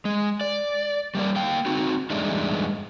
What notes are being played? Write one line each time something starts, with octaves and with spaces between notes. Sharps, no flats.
G#3
D5
G3 A#3 D5
A#3 F5 G5
C4 D#4 F#4
E2 G2 G#3 A3 D4 D#4